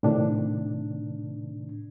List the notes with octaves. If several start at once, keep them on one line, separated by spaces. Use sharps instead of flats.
A2 C3 D#3 D4